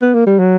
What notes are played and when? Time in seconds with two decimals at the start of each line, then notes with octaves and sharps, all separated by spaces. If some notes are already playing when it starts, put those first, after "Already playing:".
0.02 B3
0.14 A#3
0.27 G3
0.39 F#3